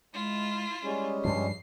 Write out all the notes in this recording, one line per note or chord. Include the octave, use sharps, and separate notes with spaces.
G#3 E4 F4
G3 G#3 C#4 G#4
G2 F3 C7